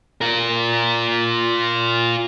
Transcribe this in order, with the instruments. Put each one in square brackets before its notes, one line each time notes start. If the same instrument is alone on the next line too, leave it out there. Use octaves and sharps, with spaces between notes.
[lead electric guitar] F4 A#4